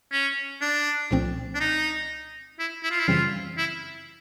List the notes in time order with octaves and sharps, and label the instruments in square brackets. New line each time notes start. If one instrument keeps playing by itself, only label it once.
[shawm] C#4
D4
[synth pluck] C2 A#2 F3 A3 C4
[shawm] D4
D#4
E4
E4
F4
E4
[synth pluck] F#2 C#3 E3 G3 C4 [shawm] F4
[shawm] E4